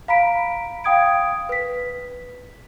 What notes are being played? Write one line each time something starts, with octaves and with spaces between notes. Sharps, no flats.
F5 A#5 B5 B6 D7
F5 G5 D#6 G#6 D7
B4 B6